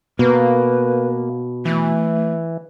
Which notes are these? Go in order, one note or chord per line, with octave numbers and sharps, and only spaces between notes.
B2 A#3 B4
E3 A3